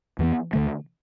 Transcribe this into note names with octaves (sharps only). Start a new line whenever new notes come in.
E2 E3 B3
D2 D3 A3